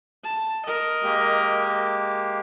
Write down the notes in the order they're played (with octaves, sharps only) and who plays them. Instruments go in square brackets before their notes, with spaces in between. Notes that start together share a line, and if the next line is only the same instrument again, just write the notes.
[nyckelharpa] A5
A#4 D#5
[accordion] G#3 A#3 G4